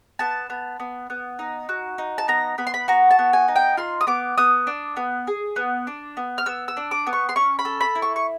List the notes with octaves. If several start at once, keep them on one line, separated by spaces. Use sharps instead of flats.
B3 A5
B3
B3
B3
D#4
F#4
D#4
A5
B3 A#5
B3 B5
C6
B5
F#4 A#5
A5
B3
G#5
D#4
G5
F4 C6
D#6
B3 D6
B3 D#6
D4
B3
G#4
B3
D4
B3
F6
B3 E6
E6
D4
D6
B3
C#6
C6
C#4 C#6
B5
A4
B5
E4
C#6
C#6